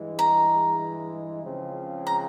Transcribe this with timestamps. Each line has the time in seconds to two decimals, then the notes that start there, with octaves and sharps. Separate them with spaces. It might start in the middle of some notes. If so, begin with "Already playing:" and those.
Already playing: G2 E3 G#3
0.19 A#5
1.44 C#2 C#3 F3 C4
2.07 A#5